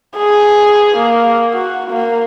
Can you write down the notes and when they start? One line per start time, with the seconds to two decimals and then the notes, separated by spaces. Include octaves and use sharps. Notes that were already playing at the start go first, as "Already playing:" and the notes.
0.17 G#4
0.97 A#3
1.54 F#4
1.91 A#3